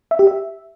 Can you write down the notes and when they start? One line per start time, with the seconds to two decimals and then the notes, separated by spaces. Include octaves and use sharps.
0.11 E5
0.19 G4
0.27 E5